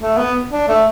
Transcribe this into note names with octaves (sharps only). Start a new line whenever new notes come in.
A3
B3
D4
A3